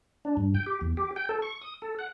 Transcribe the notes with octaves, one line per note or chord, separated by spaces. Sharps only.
D4
G2
G5
G4
E2
G4
G5
A4
C#6
D#6
A4
F#5